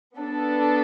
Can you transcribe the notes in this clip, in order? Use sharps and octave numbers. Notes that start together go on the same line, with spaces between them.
B3 D4 A4